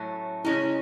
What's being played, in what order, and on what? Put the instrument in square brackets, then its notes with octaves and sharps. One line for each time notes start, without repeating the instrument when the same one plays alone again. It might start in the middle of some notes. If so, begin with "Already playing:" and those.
Already playing: [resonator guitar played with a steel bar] A2 F#3 A3 C#4
[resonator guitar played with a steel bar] C#3 G#3 C#4 [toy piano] E4
[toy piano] E4